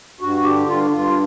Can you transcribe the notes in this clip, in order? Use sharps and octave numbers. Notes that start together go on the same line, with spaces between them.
G2 F#4
D3 G4
G2 F4
G2 F4